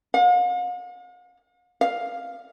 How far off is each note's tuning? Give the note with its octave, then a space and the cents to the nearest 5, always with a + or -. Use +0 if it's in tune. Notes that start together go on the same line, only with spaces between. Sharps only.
F5 +45
F5 +5